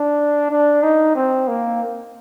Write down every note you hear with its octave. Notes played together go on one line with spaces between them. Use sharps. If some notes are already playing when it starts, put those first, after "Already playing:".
Already playing: D4
D4
D#4
C4
A#3